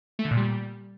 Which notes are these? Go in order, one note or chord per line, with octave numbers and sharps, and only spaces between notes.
A3
D3
A#2
G3